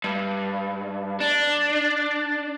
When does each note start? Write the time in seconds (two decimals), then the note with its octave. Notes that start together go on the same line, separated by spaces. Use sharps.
0.04 G2
1.20 D4